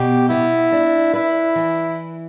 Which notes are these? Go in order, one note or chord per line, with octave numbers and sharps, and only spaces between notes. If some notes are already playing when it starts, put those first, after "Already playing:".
Already playing: B2 G4
B3 E4
D4
E4 B4
E3